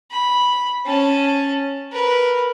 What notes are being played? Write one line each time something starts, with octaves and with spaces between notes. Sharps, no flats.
B5
C#4 A5
A#4 B4